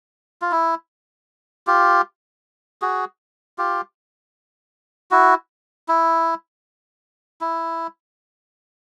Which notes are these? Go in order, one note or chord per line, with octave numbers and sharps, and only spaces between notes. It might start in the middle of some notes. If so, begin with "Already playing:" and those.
F4
E4
F4 G4
F#4 G#4
F4 G4
E4 F#4
E4
E4